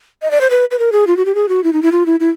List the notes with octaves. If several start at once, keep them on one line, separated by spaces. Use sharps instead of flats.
D#5
D5
C5
B4
B4
A#4
G#4
F4
F#4
G4
G#4
F#4
E4
D#4
E4
F4
E4
E4